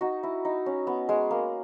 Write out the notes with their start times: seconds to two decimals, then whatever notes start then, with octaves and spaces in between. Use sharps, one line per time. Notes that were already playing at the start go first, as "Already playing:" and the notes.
0.01 D#4 F#4
0.23 E4
0.45 D#4
0.66 C#4
0.87 B3
1.09 G#3
1.31 A#3